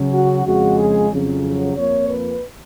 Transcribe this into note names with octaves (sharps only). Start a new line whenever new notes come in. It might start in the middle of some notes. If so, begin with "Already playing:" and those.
Already playing: C#3 F#3 C#4
F#4
F2 C#3 G#3 F#4
G#4
F2 C#3 F#3
F2 F3 A#3 C#5
B4